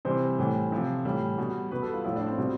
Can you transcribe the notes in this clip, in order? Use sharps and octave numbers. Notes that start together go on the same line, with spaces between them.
C3 E3 G3 C5
A2 E3 G3
C3 F3
A2 E3 G3
B2 G3
B2 G3 B4
A4
F4
A2 F3 E4
D4
C4
B2 G3